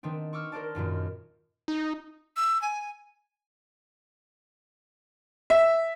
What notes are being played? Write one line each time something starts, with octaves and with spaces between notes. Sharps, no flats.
D#3 B3 C4 D4
C#6 D6 E6 F6
A#4 C5 D5 A5
G#1 F#2 A#2 D#3
D#4
E6
G#5
E5